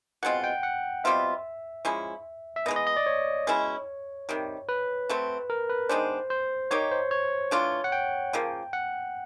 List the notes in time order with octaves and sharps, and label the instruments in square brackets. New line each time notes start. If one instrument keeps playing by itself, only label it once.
[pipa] B2 G#3 C4 F4 [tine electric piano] F#5
[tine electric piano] G5
F#5
[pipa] B2 G3 C4 F4 [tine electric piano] E5
[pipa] F3 G#3 C#4 E4
[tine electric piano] E5
[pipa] E3 G#3 B3 [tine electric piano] D#5
[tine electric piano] D#5
D#5
D5
C#5
[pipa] B2 G#3 C#4 E4
C3 D#3 G3
[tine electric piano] B4
[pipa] F#3 A3 C4
[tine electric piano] A#4
B4
[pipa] D#3 G#3 B3 D4 [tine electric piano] C5
[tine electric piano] C5
[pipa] A#3 D#4 G4 [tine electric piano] C#5
[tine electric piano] C5
C#5
[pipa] E3 A3 D4 F4
[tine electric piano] F#5
G5
[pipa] C#3 F3 A#3
[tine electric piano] F#5